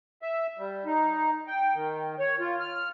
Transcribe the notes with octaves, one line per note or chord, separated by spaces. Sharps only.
E5
G3
D#4
G5
D#3
C#5
F4
F6